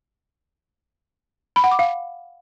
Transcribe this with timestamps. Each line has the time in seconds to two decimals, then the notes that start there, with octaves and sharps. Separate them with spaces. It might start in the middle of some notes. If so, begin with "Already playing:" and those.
1.56 B5
1.64 F#5
1.71 D6
1.79 F5